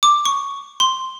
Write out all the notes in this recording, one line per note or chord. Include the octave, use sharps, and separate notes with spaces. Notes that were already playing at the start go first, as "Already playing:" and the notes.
D6
C#6
C6